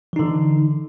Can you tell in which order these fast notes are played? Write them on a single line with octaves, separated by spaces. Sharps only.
E3 D#4 D3